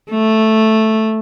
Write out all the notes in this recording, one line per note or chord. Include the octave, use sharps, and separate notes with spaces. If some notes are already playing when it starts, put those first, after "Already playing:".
A3